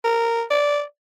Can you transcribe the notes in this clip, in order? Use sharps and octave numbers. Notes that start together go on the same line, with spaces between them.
A#4
D5